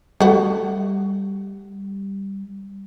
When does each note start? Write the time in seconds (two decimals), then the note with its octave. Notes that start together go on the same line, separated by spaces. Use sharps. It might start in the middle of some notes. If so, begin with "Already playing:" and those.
0.21 G3 A3 F#4